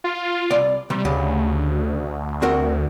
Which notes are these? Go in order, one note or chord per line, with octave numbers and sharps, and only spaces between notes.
F4
C2 D5
C3 G3
D2 C#3 G4
C4 F#4 A#4